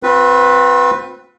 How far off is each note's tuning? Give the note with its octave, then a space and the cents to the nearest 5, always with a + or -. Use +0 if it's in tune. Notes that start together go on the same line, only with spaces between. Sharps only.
C4 -5 F4 +45 B4 +0